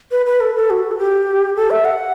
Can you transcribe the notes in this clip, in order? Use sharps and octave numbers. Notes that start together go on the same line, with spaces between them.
B4
B4
A4
A4
F#4
A4
G4
A4
E5
F#5